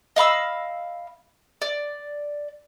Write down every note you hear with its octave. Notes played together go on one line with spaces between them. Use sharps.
D#5 F5 B5 E6
D5